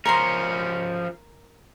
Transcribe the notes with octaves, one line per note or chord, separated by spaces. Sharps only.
F3 C#4 A#4 A#5 C6